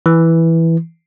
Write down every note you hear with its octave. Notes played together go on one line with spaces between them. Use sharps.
E3